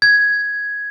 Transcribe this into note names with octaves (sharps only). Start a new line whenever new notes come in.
G#6